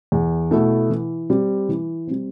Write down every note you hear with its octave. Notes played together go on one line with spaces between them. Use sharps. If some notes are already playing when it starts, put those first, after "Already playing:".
E2
B2 A3 E4 A4
E3
G3 C4
E3
G3 C4